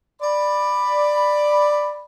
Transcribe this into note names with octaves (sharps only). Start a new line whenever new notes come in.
D5 B5